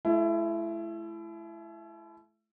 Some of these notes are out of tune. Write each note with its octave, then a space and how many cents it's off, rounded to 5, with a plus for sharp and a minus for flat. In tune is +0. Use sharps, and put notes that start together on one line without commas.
A3 -40 E4 +25